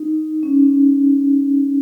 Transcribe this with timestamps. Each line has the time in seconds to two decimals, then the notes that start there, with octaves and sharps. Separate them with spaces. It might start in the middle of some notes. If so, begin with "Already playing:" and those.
Already playing: D#4
0.43 C#4